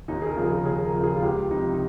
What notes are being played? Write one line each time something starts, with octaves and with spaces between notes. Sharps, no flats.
D#2 D#4
G#4
A#4
C#3 F3
G#4
D#2 G#4
A#4
C#3 F3
G#4
F4
C#2 G4
C3 F3 D#4
D#4